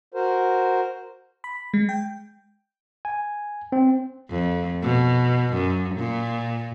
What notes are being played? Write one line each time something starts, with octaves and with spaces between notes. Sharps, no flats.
F#4 A#4 C5
B5
G#3
G5
G#5
C4
F2
B2
F#2
A#2